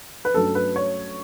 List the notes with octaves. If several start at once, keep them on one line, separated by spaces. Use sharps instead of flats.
B4
G2 F#3 A3 C#4 A4
B4
C#5